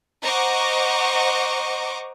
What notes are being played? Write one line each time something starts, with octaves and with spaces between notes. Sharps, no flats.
C5 D#5 F#5 A#5 C#6 D6